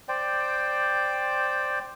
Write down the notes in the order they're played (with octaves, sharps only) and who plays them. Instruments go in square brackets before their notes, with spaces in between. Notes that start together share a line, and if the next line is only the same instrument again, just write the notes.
[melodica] C5 D5 G5